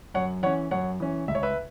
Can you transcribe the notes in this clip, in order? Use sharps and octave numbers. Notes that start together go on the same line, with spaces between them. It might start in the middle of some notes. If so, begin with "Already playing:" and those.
F#2 C#5 F#5
E3 C#4 C#5 F#5
F#2 C#5 F#5
E3 C#4
C#2 E5
C#5
B4 E5